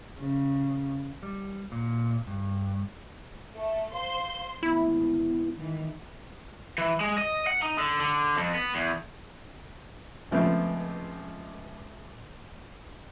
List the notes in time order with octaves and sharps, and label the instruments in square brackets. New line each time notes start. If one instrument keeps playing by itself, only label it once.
[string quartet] C#3
[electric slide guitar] G3
A#2
G2
[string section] A3 [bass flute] E5
[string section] C5 C6 [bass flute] F5
[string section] G#1 D2 [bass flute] B3 [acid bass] E4
[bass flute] D#3 [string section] E3
[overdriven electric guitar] E3
G#3
D#5
F#5
D#4
D3
D3
F2
B3
E2
[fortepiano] C#2 F3 A3 B3 C4